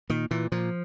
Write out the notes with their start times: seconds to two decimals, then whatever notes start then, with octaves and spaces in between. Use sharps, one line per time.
0.10 A#2 D#3
0.31 A#2 E3
0.52 A#2 F3